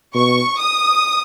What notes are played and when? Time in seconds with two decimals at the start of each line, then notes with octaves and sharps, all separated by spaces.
0.15 B2 C#6
0.59 D#6